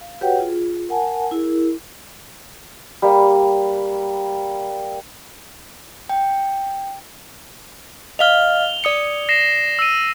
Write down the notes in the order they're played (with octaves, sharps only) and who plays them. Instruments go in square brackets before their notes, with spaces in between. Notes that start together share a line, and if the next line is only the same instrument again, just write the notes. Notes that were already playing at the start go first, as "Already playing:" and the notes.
[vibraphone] F5
F#4 G4 B4 C#5 F#5 G5
F4 G#4
A#4 F#5 G#5 A5
E4 G#4 A#4
[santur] G3 A#3
[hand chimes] G5
[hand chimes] D#5 F5 F6 [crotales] F7 G7
[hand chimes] D5 D#6 C#7
[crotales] A#6 C7 E7
E6 D#7